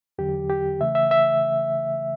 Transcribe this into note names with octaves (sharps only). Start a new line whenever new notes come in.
E2 D3 F#3 G4
G4
C#3 E3 A3 E5
E5
E5